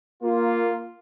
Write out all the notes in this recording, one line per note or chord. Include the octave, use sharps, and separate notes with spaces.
A#3 F4